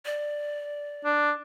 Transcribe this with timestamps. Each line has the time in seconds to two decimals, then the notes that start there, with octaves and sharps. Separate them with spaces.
0.05 D5
1.04 D4